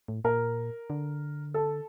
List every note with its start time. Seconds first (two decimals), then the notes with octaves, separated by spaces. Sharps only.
0.08 A2
0.25 A#2 A#4
0.90 D3
1.54 A4